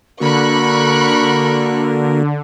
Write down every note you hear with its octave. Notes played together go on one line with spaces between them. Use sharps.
D3 A#3 F#4 A#4 B5 C#6 F#6